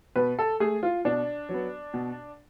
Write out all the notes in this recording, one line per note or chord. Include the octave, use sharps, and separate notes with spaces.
B2 B4
A4
A3 G#4
F4
B2 D4
F#3 B3
B2